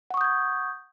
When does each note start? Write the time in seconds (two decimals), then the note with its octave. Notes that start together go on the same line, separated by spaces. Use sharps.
0.10 F#5
0.14 C#6
0.17 D#6
0.21 G6
0.24 G#6